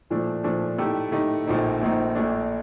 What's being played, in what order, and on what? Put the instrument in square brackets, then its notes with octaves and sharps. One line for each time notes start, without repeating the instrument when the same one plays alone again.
[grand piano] A#2 F3 A3 D4
A#2 F3 A3 D4
A2 A3 D#4 G4
A2 A3 D#4 G4
A#1 A#2 A3 C4 D#4
A#1 A#2 A3 C4 D#4
A#1 A#2 A3 D4